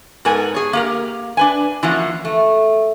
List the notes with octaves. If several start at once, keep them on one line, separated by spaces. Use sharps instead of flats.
G#2 B3 A4 A#4 G#5
G#4 C#5
A#3 G4 A#4
D4 B4 G#5
E3 F3 A#3 C#4 F4 F#4
A3